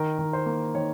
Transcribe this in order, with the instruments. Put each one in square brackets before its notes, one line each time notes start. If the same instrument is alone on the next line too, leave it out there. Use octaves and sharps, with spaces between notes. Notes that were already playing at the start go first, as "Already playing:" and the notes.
Already playing: [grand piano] D#3 A#4
D#3
C5
A#3
D#3 C#5